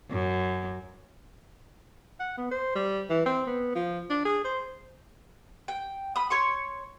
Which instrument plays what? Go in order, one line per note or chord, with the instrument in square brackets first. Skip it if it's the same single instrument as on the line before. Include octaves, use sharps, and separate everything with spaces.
[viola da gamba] F#2
[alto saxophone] F#5
B3
C5
G3
E3
C4
B3
F3
D4
G#4
C5
[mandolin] G5
B5 D#6
C#5 C6 C#6